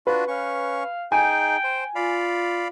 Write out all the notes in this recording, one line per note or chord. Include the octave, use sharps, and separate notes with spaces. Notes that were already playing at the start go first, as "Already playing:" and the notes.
D4 F4 F#4 B4
C#4 F5 C#6
D#4 G#4 G5 G#5
C5
F4 D5 F5 B5